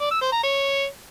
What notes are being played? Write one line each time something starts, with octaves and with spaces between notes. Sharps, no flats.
D5
E6
C5
A#5
C#5